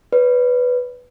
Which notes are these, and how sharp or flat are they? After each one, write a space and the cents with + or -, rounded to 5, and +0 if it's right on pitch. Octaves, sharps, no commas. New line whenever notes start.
B4 +0 D5 -45